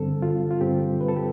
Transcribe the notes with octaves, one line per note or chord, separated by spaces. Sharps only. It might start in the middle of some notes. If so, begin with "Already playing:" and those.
Already playing: G2 D3 G3 C4 A4
F4
F4
G2 D3 G3 C4 G4
B4
A4
G4